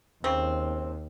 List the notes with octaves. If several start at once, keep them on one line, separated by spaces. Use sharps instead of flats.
D#2 C#3 C4